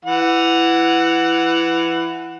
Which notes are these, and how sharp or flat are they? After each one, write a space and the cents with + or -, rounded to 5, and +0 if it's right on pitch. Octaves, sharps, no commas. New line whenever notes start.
E3 +15 F#5 +0